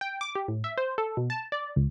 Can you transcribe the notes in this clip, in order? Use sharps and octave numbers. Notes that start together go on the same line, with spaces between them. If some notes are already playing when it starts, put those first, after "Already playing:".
G5
D6
G4
A2
E5
C5
A4
B2
A5
D5
C#2